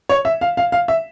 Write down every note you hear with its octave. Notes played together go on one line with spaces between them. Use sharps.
C#5
E5
F5
F5
F5
E5